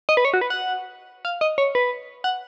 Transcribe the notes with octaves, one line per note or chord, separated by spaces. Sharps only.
D#5
B4
C#5
F#4
B4
F#5
F5
D#5
C#5
B4
F#5